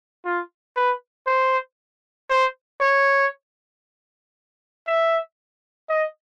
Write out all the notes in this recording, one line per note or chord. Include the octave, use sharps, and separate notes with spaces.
F4
B4
C5
C5
C#5
E5
D#5